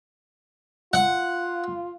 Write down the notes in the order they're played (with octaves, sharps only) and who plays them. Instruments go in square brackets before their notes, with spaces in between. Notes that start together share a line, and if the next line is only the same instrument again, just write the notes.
[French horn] F4 [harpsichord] F#5